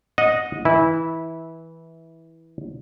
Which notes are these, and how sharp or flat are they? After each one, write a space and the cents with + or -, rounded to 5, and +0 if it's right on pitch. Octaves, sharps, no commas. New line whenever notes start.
D#5 +0 F#5 -25
E3 -15 E4 -15